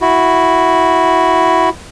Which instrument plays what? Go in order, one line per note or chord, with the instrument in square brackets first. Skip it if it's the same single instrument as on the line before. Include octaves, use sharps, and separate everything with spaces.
[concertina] E4 F#4